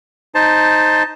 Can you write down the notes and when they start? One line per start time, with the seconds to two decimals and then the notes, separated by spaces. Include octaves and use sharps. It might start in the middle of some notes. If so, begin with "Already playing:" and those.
0.35 D#4 C5 A5